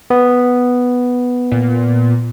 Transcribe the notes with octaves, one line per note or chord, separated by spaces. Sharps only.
B3
A#2